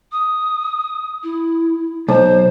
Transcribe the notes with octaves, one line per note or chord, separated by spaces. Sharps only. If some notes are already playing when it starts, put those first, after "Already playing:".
D#6
E4
B1 C5